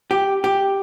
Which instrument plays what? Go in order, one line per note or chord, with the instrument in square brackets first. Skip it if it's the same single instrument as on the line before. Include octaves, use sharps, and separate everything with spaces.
[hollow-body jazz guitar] G4
G4